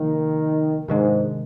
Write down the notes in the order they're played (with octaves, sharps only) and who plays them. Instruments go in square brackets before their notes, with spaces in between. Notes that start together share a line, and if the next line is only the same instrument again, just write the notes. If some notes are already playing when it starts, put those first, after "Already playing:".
Already playing: [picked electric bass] C3 F3 A#3 [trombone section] D#3
[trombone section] G#2 [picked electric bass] C3 D#3 G#3 D4